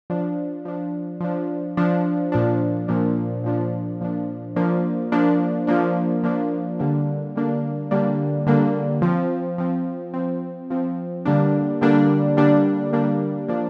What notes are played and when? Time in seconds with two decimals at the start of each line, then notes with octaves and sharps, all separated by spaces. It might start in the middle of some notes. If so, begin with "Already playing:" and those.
0.10 F3 D4
0.65 F3 D4
1.20 F3 D4
1.77 F3 D4
2.32 A#2 F3 D4
2.88 A#2 F3 D4
3.44 A#2 F3 D4
4.01 A#2 F3 D4
4.56 F3 A#3 D4
5.12 F3 A#3 D4
5.67 F3 A#3 D4
6.23 F3 A#3 D4
6.79 D3 G3 A#3 D4
7.35 D3 G3 A#3 D4
7.91 D3 G3 A#3 D4
8.46 D3 G3 A#3 D4
9.02 F3 C4
9.58 F3 C4
10.14 F3 C4
10.70 F3 C4
11.25 D3 G3 A#3 D4
11.81 D3 G3 A#3 D4
12.37 D3 G3 A#3 D4
12.93 D3 G3 A#3 D4
13.48 F3 A#3 D4